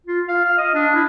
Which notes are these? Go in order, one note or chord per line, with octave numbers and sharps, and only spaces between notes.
F4
F5
F6
D#5
D4
E4